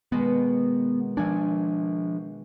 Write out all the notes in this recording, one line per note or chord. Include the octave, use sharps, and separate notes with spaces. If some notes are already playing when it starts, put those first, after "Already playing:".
B2 D#3 G#3 B3
F3 D4 G#5